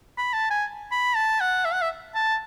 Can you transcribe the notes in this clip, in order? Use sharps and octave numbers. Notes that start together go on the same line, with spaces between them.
B5
A5
G#5
B5
A5
F#5
E5
F#5
E5
A5